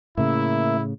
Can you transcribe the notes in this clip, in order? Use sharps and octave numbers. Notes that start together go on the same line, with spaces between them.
A2 C#3 A#3 E4 E5